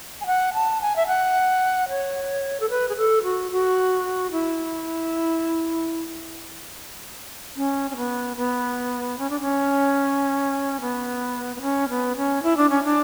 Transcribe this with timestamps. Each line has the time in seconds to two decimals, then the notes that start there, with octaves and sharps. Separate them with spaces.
0.21 G#5
0.26 F#5
0.54 A5
0.81 G#5
0.96 E5
1.07 F#5
1.89 C#5
2.60 A4
2.70 B4
2.89 G#4
2.97 A4
3.23 F#4
3.51 F#4
4.31 E4
7.56 C#4
7.90 C#4
7.97 B3
8.37 B3
9.18 C#4
9.30 D4
9.41 C#4
10.81 B3
11.56 B3
11.62 C#4
11.89 B3
12.16 C#4
12.43 E4
12.57 D4
12.70 C#4
12.84 D4